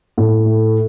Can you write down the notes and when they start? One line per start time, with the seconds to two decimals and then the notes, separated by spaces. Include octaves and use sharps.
0.18 A2
0.45 A3